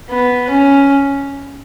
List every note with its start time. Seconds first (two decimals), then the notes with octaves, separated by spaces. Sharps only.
0.11 B3
0.50 C#4